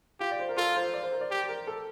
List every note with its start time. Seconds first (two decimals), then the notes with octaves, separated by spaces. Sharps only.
0.20 F4 G4
0.31 D5
0.39 C5
0.49 A#4
0.57 F4 A4
0.75 C5
0.93 D5
1.03 C5
1.12 A#4
1.21 D5
1.31 G4
1.49 A#4
1.67 A4